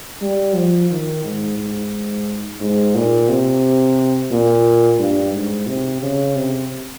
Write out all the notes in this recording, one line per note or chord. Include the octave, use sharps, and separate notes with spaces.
G3
F3
D#3
G#2
G#2
G#2
A#2
C3
A#2
G2
G#2
C3
C#3
C3